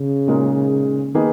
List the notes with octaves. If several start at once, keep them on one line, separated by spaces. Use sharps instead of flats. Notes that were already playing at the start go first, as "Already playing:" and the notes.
Already playing: C#3
A#2 G#3 D#4 A#4
D#3 A#3 D#4 G#4 B4